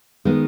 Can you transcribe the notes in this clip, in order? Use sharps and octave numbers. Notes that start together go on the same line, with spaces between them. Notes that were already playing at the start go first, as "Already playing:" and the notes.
D#3 G#3 B3